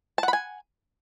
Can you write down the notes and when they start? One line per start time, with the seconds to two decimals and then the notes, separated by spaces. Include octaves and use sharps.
0.18 A5
0.23 F#5
0.28 B5
0.33 G#5